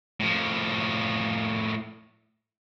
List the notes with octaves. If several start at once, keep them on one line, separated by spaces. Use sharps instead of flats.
A2 F3